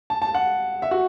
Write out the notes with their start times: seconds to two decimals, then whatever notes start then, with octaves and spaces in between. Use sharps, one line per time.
0.10 A5
0.22 A5
0.35 F#5
0.82 E5
0.91 F#4